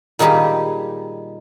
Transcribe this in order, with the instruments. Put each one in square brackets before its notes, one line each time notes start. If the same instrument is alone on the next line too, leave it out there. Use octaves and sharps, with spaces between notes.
[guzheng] A#2 D#3 G3 D#4 G4 G#4